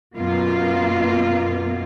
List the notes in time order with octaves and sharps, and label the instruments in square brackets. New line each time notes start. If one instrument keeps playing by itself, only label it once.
[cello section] F#2 B2 A#3 B3 F4